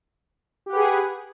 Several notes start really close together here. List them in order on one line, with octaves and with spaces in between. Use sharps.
G4 F#5 B4 G#4